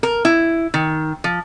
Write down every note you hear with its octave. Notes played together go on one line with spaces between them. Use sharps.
A#4
E4
D#3
F3